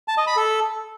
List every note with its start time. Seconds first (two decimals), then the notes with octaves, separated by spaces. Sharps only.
0.08 A5
0.17 D#5
0.27 B5
0.37 A4